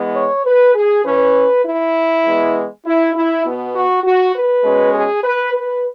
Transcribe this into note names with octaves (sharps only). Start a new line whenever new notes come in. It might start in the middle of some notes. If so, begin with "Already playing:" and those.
Already playing: E3 G#3 B3
C#5
B4
G#4
E3 C#4 B4
E4
E3 G#3 B3
E4
E4
B2 B3
F#4
F#4
B4
B2 G#3 C#4
G#4
B4
B4